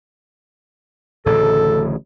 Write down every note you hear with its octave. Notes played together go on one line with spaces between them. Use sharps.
D1 A1 C#3 A4